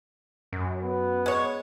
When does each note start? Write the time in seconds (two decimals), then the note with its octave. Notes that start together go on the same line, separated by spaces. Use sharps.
0.53 F#2
0.84 B3
1.26 G#3 C#5